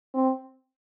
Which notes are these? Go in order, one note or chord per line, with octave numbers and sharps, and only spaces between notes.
C4